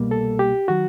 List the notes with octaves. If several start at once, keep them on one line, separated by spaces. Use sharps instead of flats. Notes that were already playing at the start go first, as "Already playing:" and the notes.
Already playing: C2 B2 G3 A#3
A4
G4
D#3 F#3 F#4